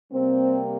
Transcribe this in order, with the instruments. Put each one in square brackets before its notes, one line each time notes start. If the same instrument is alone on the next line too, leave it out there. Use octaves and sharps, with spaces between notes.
[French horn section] C3 G3 A#3 C4